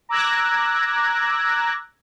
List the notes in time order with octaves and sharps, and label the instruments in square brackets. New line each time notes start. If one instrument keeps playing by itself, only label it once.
[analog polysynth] A#5 D6 E6 F#6 G#6 A#6